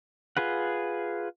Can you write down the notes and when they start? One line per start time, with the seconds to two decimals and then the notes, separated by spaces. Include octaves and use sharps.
0.37 F4 G#4 B4 F#5